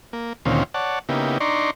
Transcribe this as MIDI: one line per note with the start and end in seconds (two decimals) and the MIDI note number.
0.13 0.33 58
0.45 0.63 38
0.45 0.63 46
0.45 0.63 51
0.45 0.63 60
0.45 0.63 61
0.45 0.63 65
0.74 0.99 73
0.74 0.99 74
0.74 0.99 78
0.74 0.99 81
1.09 1.38 49
1.09 1.38 58
1.09 1.38 59
1.09 1.38 63
1.09 1.38 64
1.09 1.38 67
1.40 1.70 62
1.40 1.70 63
1.40 1.70 74
1.40 1.70 82
1.40 1.70 84
1.40 1.70 85